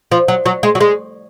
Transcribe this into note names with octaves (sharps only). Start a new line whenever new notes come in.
F3
F#3
F#3
G#3
F#3
G#3